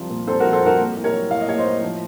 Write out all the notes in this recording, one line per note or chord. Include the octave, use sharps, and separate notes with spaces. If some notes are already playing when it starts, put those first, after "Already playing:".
Already playing: C2 F3
A#2
C2 A4 C5
F#4 A#4
F3
A4 C5
C2 F#4 A#4
A#3
A2
A#4 C#5
F#3
A2 F5
D#5
A#3 C#5
C5 D#5
A2
F3